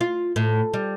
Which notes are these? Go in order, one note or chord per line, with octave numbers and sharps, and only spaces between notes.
F4
A2
G3